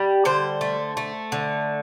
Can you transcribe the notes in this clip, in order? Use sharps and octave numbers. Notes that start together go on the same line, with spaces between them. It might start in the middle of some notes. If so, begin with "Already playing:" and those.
Already playing: G3 G4
D3 C5
A3
A3
D3